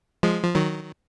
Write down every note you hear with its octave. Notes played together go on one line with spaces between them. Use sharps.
F3 G#3
F3
D#3 F#3